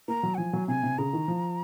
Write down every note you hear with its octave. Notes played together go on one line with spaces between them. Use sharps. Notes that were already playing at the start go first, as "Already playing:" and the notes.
A#3 A#5
F#3
F#5
F3 G#5
F#3
C3 G#5
C3
C#3 A#5
D#3
F3